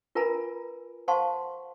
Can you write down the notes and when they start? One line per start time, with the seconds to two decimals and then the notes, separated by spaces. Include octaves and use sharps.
0.15 F4 A#4 B4 G#5 A#5 B5
1.08 C5 F5 F#5 A5 C6 C#6